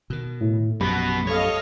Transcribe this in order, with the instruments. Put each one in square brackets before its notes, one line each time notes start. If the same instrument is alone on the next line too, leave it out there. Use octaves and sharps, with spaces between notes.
[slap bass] B2 D#3
[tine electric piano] A2
[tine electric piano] A#1 G4 B5 [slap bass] F#2 [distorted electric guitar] B2 B3
[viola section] A4 D#5 F5 [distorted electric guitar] C#5